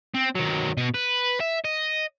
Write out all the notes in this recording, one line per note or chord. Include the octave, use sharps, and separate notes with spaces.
C4
D#3 F#3
B2 D#5
B4
E5
D#5